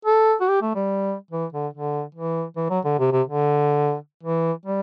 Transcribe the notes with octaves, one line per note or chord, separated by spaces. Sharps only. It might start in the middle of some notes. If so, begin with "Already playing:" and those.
A4
F#4
G4
A3
G3
E3
D3
D3
E3
E3
F#3
D3
C3
C3
D3
E3
G3